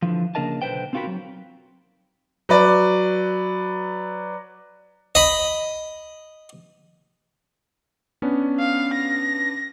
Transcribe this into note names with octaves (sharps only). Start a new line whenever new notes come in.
D3 E3 F3
C#3 A#3 D4 A#4 D#5 A5
B1 D3 B4 C5 G5
C4 D#4 F4 F#4 A#4 B5
F#3
F#3 B4 D5
D#5 B5
B3 C#4 D4
F5
A#6